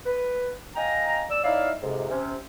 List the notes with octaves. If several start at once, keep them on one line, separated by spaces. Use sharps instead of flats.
B4
D#5 F5 G5 G#5 A#5
D5 E6
D#4 E4 C#5 D5 E5 F5
F2 G#2 C3
C3 C#4